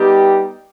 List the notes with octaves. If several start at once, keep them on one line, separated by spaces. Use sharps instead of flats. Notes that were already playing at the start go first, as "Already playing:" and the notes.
Already playing: G3 B3 D#4 G4